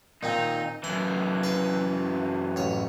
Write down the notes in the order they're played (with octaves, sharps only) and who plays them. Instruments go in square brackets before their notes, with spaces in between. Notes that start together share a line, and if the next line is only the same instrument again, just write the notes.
[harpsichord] A#2 D#3 C4 [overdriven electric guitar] D#4
[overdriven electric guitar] F#2 E3 [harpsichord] G#5
[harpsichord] B4 C6
A1 C#5